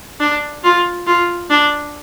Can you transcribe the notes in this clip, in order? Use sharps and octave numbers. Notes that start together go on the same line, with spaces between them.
D4
F4
F4
D4